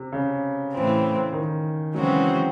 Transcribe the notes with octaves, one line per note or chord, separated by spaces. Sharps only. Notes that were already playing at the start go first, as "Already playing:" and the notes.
Already playing: C3
C#3
A2 E3 C4
D#3
C#3 E3 F#3 G#3 C4 F#4